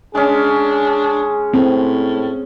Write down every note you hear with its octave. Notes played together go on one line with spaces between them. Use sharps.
G#3 C#4 D4 G#4
A2 C4